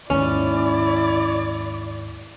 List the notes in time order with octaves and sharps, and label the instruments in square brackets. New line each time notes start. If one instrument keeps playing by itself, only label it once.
[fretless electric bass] D#2 G#2 [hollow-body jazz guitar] C#4 [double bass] E4 [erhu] D5